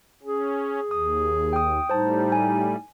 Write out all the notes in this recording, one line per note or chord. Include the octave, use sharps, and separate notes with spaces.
C#4 G#4
D#2 D#6
G5 D#6
A2 G3 D#4 C5 A5
G#5